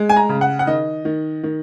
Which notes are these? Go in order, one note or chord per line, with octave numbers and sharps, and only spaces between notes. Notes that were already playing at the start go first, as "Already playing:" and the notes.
Already playing: G#3
G#5
A#5
C#3
F#5
F#5
D#3 D#5
D#3
D#3